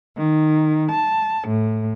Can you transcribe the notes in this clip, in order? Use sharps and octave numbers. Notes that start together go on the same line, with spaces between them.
D#3
A5
A2